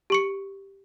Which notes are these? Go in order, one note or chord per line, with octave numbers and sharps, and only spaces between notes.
G4 C#6 C#7